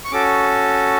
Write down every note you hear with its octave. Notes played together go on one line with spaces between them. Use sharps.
C#6
C#4 F#4 A4 D6